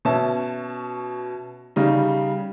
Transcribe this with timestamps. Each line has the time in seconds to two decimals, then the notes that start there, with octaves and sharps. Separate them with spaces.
0.05 B2 C#4 E5 A5
1.76 C#3 G3 D#4